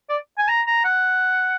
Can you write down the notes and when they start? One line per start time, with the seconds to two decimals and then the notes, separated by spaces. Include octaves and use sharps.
0.10 D5
0.38 G#5
0.48 A#5
0.67 A#5
0.85 F#5